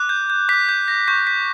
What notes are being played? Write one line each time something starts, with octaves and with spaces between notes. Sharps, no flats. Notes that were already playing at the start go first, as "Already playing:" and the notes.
Already playing: D6 F#6
G6
G6
D6 F#6 B6
G6
A#6
C#6 G6 B6
B6